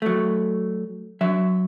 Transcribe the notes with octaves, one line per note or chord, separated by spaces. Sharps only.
F#3 A3
F#3 E5